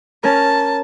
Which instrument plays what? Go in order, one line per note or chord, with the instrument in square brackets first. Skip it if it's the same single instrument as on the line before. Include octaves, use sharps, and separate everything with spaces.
[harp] C#4 A#4 [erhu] A5